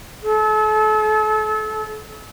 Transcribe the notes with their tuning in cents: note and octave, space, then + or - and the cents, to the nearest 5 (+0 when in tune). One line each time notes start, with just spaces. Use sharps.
A4 -35